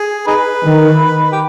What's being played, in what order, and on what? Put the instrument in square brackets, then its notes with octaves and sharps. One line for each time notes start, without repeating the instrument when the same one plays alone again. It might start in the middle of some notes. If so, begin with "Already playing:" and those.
Already playing: [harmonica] G#4
D#4 G#4 B4
[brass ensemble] D#3
[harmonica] G4